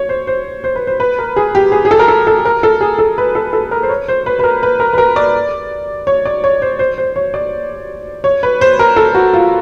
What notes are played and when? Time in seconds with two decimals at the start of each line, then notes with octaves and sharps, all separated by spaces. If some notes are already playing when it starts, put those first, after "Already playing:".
Already playing: C#5
0.09 C5
0.27 C5
0.64 C5
0.76 B4
0.87 C5
1.00 B4
1.19 A#4
1.36 G#4
1.55 G4
1.72 G#4
1.85 G#4
1.91 A4
1.99 A#4
2.08 A4
2.27 A4
2.45 A#4
2.63 A4
2.81 G#4
2.99 A4
3.18 B4
3.35 A4
3.53 A4
3.71 A#4
3.83 C5
3.89 C#5
4.08 C5
4.26 B4
4.39 B4
4.43 A#4
4.63 B4
4.80 A#4
4.93 B4
4.98 A#4
5.16 D5
6.07 C#5
6.25 D5
6.44 C#5
6.62 C5
6.79 C5
6.98 C5
7.16 C#5
7.34 D5
8.24 C#5
8.43 B4
8.61 C5
8.79 A#4
8.96 A4
9.15 F#4
9.33 F4